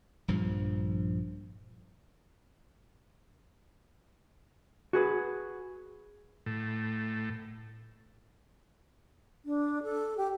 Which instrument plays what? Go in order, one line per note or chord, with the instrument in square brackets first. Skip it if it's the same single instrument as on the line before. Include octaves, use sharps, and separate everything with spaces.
[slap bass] A#1 G2 F3
[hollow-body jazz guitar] F#4 G#4 B4
[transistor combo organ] A2
[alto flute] D4
A4
G4